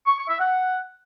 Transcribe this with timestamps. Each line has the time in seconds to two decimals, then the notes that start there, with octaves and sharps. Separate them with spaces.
0.06 C#6
0.17 C#6
0.28 E5
0.39 F#5